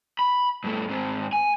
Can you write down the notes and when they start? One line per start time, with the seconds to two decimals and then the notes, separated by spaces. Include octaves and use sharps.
0.19 B5
0.64 G2 A3
0.89 G#2 C4
1.33 G#5